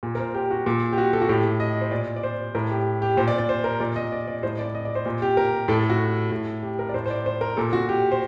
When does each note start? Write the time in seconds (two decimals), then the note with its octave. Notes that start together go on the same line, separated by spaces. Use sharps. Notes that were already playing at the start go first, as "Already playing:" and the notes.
0.03 A#2
0.15 A#4
0.19 C5
0.34 G4
0.51 F#4
0.66 A#2
0.92 G4
0.98 F#4
1.13 A4
1.22 F#4
1.29 A2 G4
1.60 D#5
1.81 C5
1.91 A#2 D5
2.16 D5
2.23 C5
2.55 A2 A#4
2.70 G4
3.02 G4
3.17 A#2 C5
3.28 D5
3.38 D5
3.49 C5
3.64 A#4
3.80 A#2 D5
3.96 D#5
4.12 D5
4.28 D5
4.43 A2 C5
4.59 D5
4.75 D#5
4.85 D5
4.95 C5
5.06 A#2
5.22 G4
5.37 A#4
5.68 A2 A4
5.79 A4
5.90 F#4
6.31 A2
6.63 G4
6.79 A#4
6.89 D5
6.94 A2 C5
7.06 C5
7.10 D5
7.26 C5
7.41 A#4
7.57 A#2 A4
7.73 F#4
7.89 G4
8.12 C5